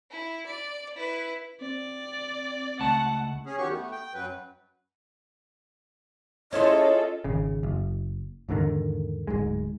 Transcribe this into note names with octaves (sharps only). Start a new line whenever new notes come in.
E4
D5
E4 B4
C4 D5
C#2 A3 F#5 A5
C#4 G#4
E2 D#3 F#3 B3 G4 C#6
A3 B3
G5
F#2 F#3 B4
C#4 E4 F4 G#4 A4 C5 D#5
G#1 C#3
F#1
E2 G#2 D3 D#3
D1 C#2 G#2 G#3